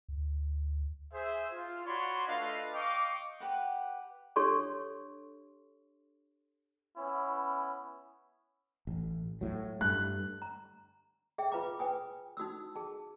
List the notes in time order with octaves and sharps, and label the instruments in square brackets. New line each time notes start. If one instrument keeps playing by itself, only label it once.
[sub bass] D2
[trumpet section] G#4 C5 E5
F4
F#4 C#5 D5 B5 C6
A3 D4 F4 B4 D#5 F5
D#5 F5 G5 C#6 D6
[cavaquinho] G4 B4 F#5
[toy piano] D4 G4 A4 C#5 C6 C#6
[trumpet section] B3 C#4 E4
[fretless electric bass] A1
A2 F#3
[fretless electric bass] G2 A3 [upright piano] F#6
[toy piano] A#5
G#4 E5 G5
F4 B4 F5 A#5 D6
B4 G5 G#5 D#6
D#4 F#4 D#6 E6
G#4 A5